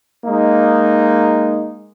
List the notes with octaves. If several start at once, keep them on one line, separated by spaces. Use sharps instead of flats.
G#3 A#3 D#4